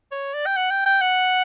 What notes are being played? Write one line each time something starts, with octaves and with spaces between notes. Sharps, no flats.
C#5
D5
G5
F#5
G5
G5
F#5